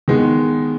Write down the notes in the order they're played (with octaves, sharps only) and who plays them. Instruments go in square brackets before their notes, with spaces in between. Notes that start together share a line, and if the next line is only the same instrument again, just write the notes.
[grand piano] D#3 G#3 B3